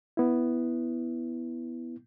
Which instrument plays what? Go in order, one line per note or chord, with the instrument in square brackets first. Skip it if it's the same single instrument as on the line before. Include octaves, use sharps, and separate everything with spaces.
[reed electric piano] B3 E4